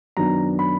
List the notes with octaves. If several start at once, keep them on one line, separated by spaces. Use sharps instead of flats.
F#2 D#3 F#3 B3 D4 A#5
B5